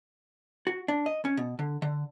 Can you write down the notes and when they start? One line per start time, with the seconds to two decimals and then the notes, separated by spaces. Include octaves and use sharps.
0.67 F#4
0.88 D4
1.06 D#5
1.25 C#4
1.37 B2
1.59 D3
1.82 D3